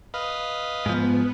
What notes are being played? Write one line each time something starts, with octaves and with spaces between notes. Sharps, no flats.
B4 D#5 F5
G#2 F3 B3